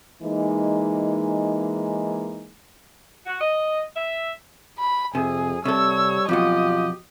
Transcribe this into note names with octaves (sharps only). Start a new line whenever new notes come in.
E3 G#3 A#3 D#4
F#4
D#5
E5
B5
F2 C3 G#4
C3 G3 A4 C#5 E6
F2 B2 F#3 F4 G4 D#5